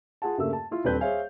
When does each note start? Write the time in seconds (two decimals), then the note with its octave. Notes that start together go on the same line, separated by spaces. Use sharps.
0.22 F4 G#4 F#5 A5
0.38 G2 C#3 A3 A#3 E5 E6
0.53 A5
0.71 E4 F4
0.84 D#1 C4 D4 A4 B4 G6
1.00 G#4 C5 C#5 E5 F5 G#5